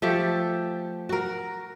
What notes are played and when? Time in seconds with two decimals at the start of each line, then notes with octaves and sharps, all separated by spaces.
0.02 F3 A3 G4 A4
1.09 F#4 A#4